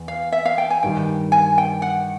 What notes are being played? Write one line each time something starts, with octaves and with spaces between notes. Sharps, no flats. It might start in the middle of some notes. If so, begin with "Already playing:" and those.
Already playing: E2
F5
E5
F5
G5
G#5
G2 D#3 G3 G5
G#5
G5
F#5